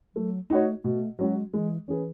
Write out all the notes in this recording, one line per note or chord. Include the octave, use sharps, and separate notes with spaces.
F#3 A3
A3 D#4 F#4 C#5
B2 A3
F#3 G#3 C#4 F#4
E3 G#3
E3 C#4 G#4 B4